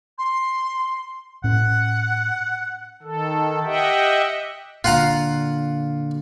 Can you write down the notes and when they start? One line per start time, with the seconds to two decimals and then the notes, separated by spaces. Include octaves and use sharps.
0.18 C6
1.44 A2 C#4 F#5
3.03 D#3 A4
3.64 G4 D#5 E5 F#5 G5
4.84 A#2 D3 F4 F#5 A#5